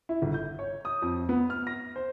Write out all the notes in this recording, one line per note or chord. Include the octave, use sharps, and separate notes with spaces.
E4
G1
G6
C#5
D#6
F2
B3
F6
A#6
C5